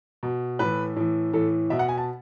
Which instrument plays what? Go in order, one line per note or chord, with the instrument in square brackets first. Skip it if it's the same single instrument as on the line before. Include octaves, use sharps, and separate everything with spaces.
[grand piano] B2
A2 E3 B4
A2 E3
A2 E3 A4
B2 E5
F#5
G#5
A5